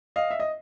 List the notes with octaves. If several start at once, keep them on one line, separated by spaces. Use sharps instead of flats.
D#5 F5
E5
D#5